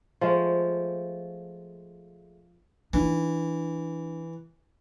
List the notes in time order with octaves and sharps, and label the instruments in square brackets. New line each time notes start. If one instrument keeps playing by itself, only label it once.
[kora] F3 G#3 A3
[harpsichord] E3 [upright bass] D4 D#4